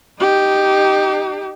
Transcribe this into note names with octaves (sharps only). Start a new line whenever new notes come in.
D#4 G4